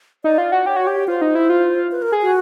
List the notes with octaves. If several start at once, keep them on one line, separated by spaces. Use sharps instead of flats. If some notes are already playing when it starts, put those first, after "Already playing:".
D#4 D5
F4
F#4
G4 C#5
F#4
G4
F4 C5
D#4
E4
F4
B4
A#4
G#4
F#4